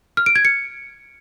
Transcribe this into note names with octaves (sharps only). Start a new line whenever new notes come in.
F6
D7
G#6
C#7